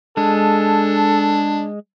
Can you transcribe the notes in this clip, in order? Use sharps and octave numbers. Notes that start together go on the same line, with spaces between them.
G#3 D4 A4